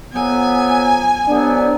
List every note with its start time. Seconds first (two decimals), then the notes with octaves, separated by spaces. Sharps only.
0.13 F2 F#3 B3 G#5
1.27 C2 F#3 B3 D4